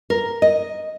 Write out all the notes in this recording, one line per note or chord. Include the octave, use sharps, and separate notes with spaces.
A#4
D#5